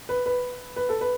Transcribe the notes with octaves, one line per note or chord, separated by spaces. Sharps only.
B4
B4
B4
A4
B4